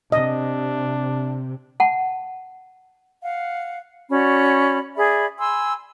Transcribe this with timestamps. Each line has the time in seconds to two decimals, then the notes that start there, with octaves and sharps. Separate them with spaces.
0.12 C3 D4 D#5
1.80 F#5 A5
3.23 F5 F#5
4.11 C#4 F#4 D5 B5
4.96 G#4 D5 E5 B5
5.39 G#5 B5 C6 E6